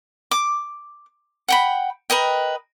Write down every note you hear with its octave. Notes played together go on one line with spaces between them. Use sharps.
D6
F#5 G5 B5
A#4 B4 D#5 G5